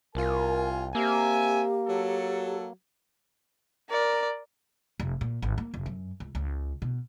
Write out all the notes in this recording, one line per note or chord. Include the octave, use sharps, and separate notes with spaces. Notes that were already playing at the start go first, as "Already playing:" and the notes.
C2 F4 A#4 G#5
A#3 C4 G4 E5 G#5
F#3 A4
A#4 D5
F1
A#2
G#1
A#3
F1
F#2
C#2
C#2
B2